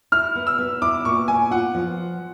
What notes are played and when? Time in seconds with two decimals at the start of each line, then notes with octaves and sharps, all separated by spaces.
0.12 E4 F6
0.35 B3
0.47 E6
0.59 B3
0.82 E4 D6
1.05 A#2 C#6
1.27 B3 G#5
1.51 F4 F#5
1.75 F3